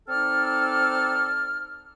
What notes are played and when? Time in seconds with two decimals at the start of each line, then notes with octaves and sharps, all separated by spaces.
0.09 C4 D#4 A4 D5 F6